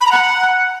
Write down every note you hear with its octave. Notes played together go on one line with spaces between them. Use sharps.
B5
A#5
F#5